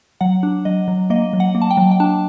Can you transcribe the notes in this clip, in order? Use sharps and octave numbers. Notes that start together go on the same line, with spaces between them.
F#3 F#5
D4
F#3 D#5
F#3
A#3 D#5
F#3
F#5
A#3
A5
G5
F#3
G5
D4 A5